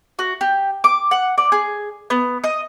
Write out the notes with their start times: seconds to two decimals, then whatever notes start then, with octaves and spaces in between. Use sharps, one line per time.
0.19 F#4
0.41 G4
0.84 D6
1.11 F#5
1.38 D5
1.52 G#4
2.10 B3
2.44 D#5